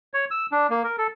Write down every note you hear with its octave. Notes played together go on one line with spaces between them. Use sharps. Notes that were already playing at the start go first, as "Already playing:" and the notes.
C#5
E6
D4
A#3
A#4
A4